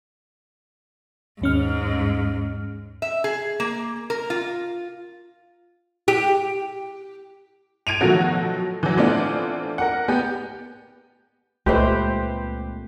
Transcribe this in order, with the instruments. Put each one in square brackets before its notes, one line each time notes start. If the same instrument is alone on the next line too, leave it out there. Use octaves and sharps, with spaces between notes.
[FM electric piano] D#2 C#4 F6 [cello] G#2
[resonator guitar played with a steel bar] E5
G#4
A#3
A#4
F4
[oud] G4
[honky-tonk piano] G#6 D7 D#7 F7
B2 D#3 F3 F#3 A3 F#4
E3 F#3
E3 A3 B3 C4 D4 F4
A#4 F#5
B3 G4
[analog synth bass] C#2 [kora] A#2 A3 C4 [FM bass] G#3 [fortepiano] G4 B4 C5